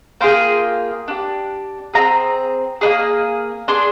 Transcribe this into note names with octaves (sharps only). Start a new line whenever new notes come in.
A#3 F4 G#4 G5
D4 G4
C4 F4 G#4 A#5
A#3 D4 G#4
D4 G#4 C6